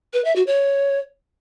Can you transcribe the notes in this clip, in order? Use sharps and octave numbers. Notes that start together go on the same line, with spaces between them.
B4
E5
F#4
C#5